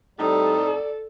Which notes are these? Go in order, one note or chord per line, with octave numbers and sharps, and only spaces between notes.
A2 G3 C4 D#4 A4
D5